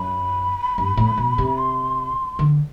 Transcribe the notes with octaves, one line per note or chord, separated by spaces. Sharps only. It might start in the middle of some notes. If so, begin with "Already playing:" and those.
Already playing: F#2 B5
G2
A2
B2
C3
C6
D3